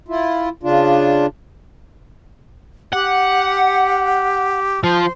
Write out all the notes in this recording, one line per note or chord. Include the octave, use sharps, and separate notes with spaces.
E4 F4
C#3 D4 F4
G4 F#5
F3 C5